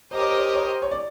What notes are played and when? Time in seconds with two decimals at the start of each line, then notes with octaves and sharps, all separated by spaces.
0.11 G4 A#4 C5 D#5
0.20 C#5
0.29 C5
0.37 C#5
0.46 C5
0.54 C#5
0.63 C5
0.82 C#5
0.91 D5